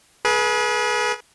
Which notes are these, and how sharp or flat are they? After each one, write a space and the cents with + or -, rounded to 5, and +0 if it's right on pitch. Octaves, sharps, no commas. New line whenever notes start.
G#4 +25 B4 -30